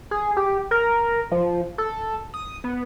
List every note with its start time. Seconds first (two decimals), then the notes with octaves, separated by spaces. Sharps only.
0.11 G#4
0.37 G4
0.71 A#4
1.31 F3
1.78 A4
2.34 D#6
2.64 B3